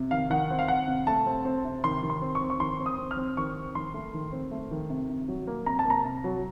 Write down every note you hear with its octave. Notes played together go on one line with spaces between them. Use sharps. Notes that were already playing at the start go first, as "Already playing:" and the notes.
Already playing: C3
D#3 F5
D#3 F#5
C4
F5
C4 F#5
C3
A3 A5
C4
C4
C3
D#3 C6
D#3
C6
C4
C#6
C4
C#6
D#3 C6
C4
D#6
C4
F6
C4
D#3 C#6
C4
D#3 C6
A3
D#3
C4
A3
D#3
C3
C3
F#3
A#3
C3 A#5
A5
A#3
A#5
C3
F#3